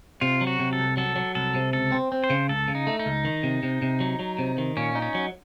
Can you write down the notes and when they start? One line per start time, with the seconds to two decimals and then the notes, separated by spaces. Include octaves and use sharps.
0.21 C3 F4
0.41 F#3
0.47 F#4
0.60 C3
0.73 A4
0.78 C2
0.97 F#3 A4
1.16 F#3
1.35 C2 A4
1.55 C3
1.73 C#2 A4
1.92 C4
2.12 C4
2.24 C5
2.30 C#3
2.49 C#2 A4
2.68 C#3
2.75 D#4
2.87 A3
2.99 D#4
3.06 C#2
3.25 D#3
3.43 C3
3.63 C3
3.82 C3
4.00 F#3
4.19 F#3
4.39 C3
4.58 D#3
4.77 A#2 C#4
4.95 D#4
5.02 C#4
5.15 F#3